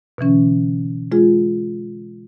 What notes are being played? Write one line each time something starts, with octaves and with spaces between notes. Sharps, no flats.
B2 D3 E3 C#4
G#3 F4 G#4